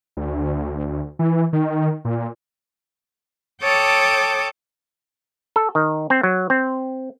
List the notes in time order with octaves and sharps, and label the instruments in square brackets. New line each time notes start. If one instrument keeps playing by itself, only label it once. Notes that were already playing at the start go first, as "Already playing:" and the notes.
[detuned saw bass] D2
E3
D#3
A#2
[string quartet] A4 C#5 G5 A5 D6 D#6
[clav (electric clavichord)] A4
D#3
C4
F#3
C4